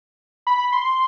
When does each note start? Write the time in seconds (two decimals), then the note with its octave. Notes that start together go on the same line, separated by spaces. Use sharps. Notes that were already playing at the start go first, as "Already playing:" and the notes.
0.47 B5
0.73 C6